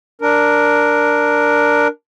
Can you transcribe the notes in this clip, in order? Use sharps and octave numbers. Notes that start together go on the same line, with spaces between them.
D4 A#4